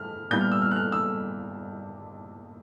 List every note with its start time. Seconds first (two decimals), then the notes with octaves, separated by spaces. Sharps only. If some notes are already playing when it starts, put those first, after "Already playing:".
Already playing: F6
0.30 A#2 G3 B3 E4 G6
0.41 F6
0.52 E6
0.62 F6
0.71 F#6
0.76 F6
0.92 E6